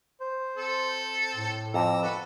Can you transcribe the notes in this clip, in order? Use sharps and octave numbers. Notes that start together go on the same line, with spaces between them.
C5
C4 A4
A2
F2 A#5 D6 E6
F#4 A4 B4